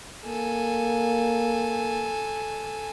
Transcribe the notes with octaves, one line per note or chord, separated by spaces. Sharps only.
A#3 A4 G#5